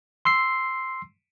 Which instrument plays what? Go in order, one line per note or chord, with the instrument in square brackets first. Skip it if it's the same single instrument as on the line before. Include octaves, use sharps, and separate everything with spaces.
[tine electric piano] C6 E6 C7